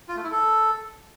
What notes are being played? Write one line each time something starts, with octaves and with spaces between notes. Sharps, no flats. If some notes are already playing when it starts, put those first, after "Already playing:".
F4
A3
E4
A4